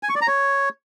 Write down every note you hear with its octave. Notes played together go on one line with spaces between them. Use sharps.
G#5
C#6
D5
A#5
C#5